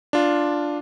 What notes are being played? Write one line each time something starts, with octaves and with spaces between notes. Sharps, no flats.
D4 F4